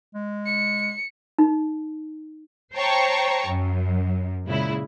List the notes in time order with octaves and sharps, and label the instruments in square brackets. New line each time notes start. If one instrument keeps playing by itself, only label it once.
[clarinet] G#3
[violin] C#7
[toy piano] D#4
[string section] C5 C#5 G5 A5 A#5 C#6
F#2
A#2 C#3 G#3 E4